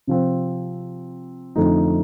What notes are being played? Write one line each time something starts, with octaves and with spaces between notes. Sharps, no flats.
C3 F3 C4
F2 D3 A3 D#4